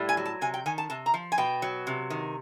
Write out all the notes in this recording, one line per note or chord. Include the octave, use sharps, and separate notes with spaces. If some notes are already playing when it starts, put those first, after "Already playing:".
Already playing: A2 G3
G#5
F#3
A5
C3 G#5
G5
D#3 G#5
A5
C3 A5
A#5
F3
G#5
B2 G5
F#3
C3
D#3